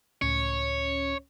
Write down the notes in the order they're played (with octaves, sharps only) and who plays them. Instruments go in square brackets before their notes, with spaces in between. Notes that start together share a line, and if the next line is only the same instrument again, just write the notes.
[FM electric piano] C#2 A2 C#4 [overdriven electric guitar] C#5